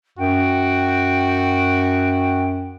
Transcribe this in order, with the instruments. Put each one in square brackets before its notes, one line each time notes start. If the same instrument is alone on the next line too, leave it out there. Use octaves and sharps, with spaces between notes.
[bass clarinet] F#2 [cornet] F#4 [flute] G5